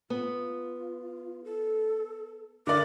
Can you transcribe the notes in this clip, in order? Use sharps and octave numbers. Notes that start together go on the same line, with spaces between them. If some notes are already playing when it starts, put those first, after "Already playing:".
B3 F4
A4
D3 A#4 D5 D6 A6